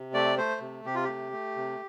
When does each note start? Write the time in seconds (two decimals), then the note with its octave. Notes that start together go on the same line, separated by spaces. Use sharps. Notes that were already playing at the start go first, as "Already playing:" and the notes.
Already playing: C3
0.14 A3 D5
0.38 A3 C5
0.61 C3
0.85 C3 G4
0.95 F4
1.04 A3 G4
1.32 A3
1.56 C3